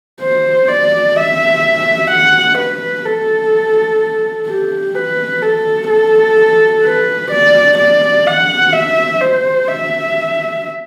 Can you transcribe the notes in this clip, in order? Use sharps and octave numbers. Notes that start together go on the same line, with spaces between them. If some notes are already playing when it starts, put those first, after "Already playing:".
C5
D5
E5
F#5
B4
A4
G4
B4
A4
A4
B4
D5
D5
F#5
E5
C5
E5